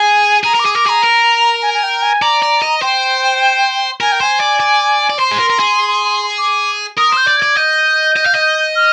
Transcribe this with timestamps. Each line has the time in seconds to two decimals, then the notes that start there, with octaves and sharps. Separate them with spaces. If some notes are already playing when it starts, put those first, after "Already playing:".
Already playing: G#4 G#5
0.44 G#4 A#5
0.55 A#4 D6
0.65 G#4
0.74 A#4 D6
0.86 G#4 A#5
1.03 A#4
1.62 G#5
1.74 G#5
1.83 G5
2.02 G#5
2.22 D5 A#5
2.43 D5
2.62 D#5
2.82 C5 G5
4.01 A#4 G#5
4.12 G5
4.20 C5 G#5
4.40 D5
4.60 D5
5.10 D5
5.19 C5 C6
5.31 G#4
5.39 A#4
5.50 A#4
5.60 G#4
6.38 D6
6.97 A#4 D#6
7.12 C5 G6
7.27 D5
7.37 G#6
7.42 D5
7.57 D#5 G6
8.16 D#5
8.26 F5
8.35 D#5
8.76 F6